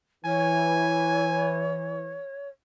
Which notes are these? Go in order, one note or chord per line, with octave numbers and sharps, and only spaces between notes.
E3 C#5 G#5